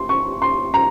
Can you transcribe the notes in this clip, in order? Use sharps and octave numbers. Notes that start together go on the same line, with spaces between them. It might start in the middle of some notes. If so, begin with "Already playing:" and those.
Already playing: C6
C#6
C6
A#5